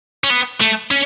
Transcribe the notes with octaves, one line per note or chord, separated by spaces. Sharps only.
C#4
B3
A3
C#4